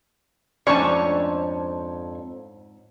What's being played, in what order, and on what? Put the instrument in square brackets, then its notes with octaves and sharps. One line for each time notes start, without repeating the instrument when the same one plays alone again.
[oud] F2 D4 [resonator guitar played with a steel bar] G#2 C#4 [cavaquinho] C#5 C#6 [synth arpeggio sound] D5 A5